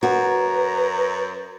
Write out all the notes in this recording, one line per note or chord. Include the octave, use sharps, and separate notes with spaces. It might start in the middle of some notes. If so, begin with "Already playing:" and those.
F#2 F#4 B4 A#5